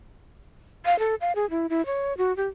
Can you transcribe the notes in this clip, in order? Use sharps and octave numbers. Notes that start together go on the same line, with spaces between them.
F5
A4
F5
G#4
E4
E4
C#5
F#4
G4